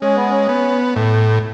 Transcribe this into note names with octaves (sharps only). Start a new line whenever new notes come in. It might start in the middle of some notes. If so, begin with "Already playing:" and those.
G#3 C#4
B3
C#4
B3
A2